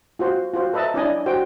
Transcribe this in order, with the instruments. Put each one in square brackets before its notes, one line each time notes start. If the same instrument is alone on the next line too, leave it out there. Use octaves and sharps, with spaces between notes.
[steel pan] F4 F#4 C5
F4 F#4 C5
A4 B4 D#5 E5 A5 A#5
C#4 D4 E4 D5 D#5 G#5
F#4 C5 G5